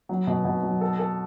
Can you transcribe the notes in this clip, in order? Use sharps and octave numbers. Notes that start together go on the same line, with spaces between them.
F#3
B2
B2
F#3
A4
A4